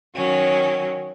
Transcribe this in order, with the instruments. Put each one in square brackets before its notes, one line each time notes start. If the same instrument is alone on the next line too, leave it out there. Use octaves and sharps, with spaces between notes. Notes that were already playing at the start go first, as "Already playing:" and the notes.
[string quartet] D#3 F#3 C#4